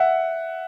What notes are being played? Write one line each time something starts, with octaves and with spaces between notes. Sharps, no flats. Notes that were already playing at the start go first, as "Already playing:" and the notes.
Already playing: E5 F#5